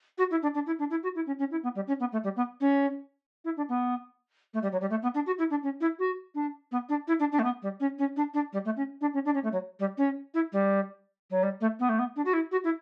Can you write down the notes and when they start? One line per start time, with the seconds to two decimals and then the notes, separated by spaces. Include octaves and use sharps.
0.18 F#4
0.30 E4
0.42 D4
0.54 D4
0.66 E4
0.79 D4
0.90 E4
1.03 F#4
1.15 E4
1.26 C#4
1.39 C#4
1.51 E4
1.63 B3
1.75 G3
1.87 C#4
2.00 B3
2.12 A3
2.23 G3
2.36 B3
2.60 C#4
3.44 E4
3.57 D4
3.69 B3
4.53 A3
4.62 G3
4.72 F#3
4.81 G3
4.90 A3
5.02 B3
5.14 D4
5.26 F#4
5.38 E4
5.50 D4
5.63 C#4
5.80 E4
5.99 F#4
6.34 D4
6.71 B3
6.89 D4
7.07 E4
7.19 D4
7.31 D4
7.39 A3
7.43 B3
7.62 G3
7.80 C#4
7.98 C#4
8.16 D4
8.34 D4
8.52 G3
8.65 A3
8.76 C#4
9.01 D4
9.13 C#4
9.25 D4
9.34 C#4
9.43 A3
9.52 F#3
9.79 G3
9.97 C#4
10.34 E4
10.52 G3
11.30 F#3
11.43 G3
11.60 A3
11.79 B3
11.89 A3
11.99 B3
12.16 D4
12.25 F#4
12.33 E4
12.51 F#4
12.64 E4